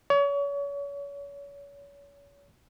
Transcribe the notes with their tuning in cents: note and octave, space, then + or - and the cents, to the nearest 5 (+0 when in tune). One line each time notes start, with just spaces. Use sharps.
C#5 +35